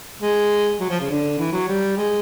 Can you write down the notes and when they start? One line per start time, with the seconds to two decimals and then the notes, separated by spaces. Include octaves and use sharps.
0.22 G#3
0.80 F#3
0.89 F3
1.00 C#3
1.10 D3
1.39 E3
1.53 F#3
1.67 G3
1.97 G#3